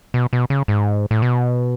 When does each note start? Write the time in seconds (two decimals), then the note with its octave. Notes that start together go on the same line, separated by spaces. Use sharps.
0.14 B2
0.33 B2
0.50 C#3
0.68 G#2
1.11 A2
1.22 B2